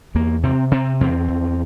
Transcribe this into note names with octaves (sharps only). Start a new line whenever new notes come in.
E2 A#3
C3 C4
C3 C4
E2 C4
E2